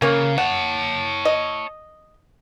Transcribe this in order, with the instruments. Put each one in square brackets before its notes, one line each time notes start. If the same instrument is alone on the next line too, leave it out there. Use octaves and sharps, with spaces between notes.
[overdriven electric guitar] C#3 [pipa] A#3 C#4
[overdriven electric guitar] C#5 A5 [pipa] F#5
[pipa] D#5